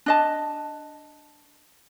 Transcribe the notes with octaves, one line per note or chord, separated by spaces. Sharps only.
D4 D#5 A5